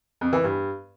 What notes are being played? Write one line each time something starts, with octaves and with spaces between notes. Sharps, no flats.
F2
E3
G2